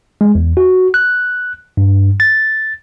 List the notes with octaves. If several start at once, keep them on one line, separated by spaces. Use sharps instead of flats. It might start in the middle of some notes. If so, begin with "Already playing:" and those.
G#3
E2
F#4
F#6
G2
A6